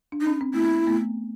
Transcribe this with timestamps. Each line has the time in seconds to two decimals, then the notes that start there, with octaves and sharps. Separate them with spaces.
0.12 D4
0.21 D#4
0.27 C#4
0.41 C4
0.54 A3 B3 E4
0.87 A3 B3